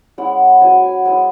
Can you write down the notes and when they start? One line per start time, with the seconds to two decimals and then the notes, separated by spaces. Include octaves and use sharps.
0.18 G#3 C#4 E4 F#5
0.62 F#3 C#4 E4 G#5
0.83 G#5
1.05 G#3 C#4 E4 G#5